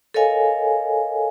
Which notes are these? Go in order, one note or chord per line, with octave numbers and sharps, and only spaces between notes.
A4 A#4 C#5 D#5 F5 G#5